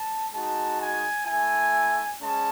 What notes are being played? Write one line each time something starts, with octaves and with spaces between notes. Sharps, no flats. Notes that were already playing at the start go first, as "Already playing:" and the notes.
Already playing: A5
G#3 D#4 F#4 A5
G#5
A3 E4 G#5
G#3 C#4 A5